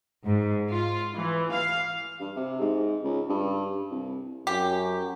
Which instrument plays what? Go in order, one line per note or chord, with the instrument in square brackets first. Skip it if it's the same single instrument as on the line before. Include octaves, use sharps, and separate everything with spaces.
[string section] G#2
F4
E3
F5
[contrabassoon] G2
C3
G#2
C#2
G2
C2
[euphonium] F#2 [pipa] G4